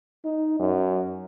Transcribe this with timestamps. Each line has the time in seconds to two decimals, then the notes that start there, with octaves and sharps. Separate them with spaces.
0.25 D#4
0.59 F#2